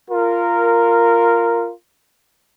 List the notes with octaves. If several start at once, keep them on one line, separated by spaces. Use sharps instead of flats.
F4 A#4